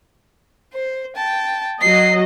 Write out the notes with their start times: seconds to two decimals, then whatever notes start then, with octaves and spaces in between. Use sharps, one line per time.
0.73 C5
1.16 G5 A5
1.81 F#3 D#5 C7